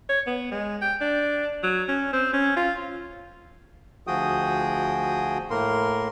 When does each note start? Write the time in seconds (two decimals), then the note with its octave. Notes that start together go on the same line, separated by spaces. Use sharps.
0.09 C#5
0.27 B3
0.51 G#3
0.82 G5
1.01 D4
1.63 F#3
1.88 C#4
2.13 C4
2.33 C#4
2.56 F4
4.07 D2 F3 F#4 G#4 G5 D#6
5.50 A2 A#3 A#4 C6